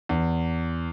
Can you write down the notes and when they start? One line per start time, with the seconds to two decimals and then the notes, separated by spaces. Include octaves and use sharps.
0.09 E2